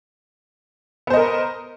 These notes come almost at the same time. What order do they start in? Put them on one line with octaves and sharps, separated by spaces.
B3 C5 D#5 A#4